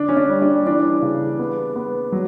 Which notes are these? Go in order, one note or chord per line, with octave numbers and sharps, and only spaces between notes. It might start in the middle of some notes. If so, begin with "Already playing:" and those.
Already playing: D3 D4
C#4
D4
G3
D4
E3 D4
C#3
B3
B3
F#3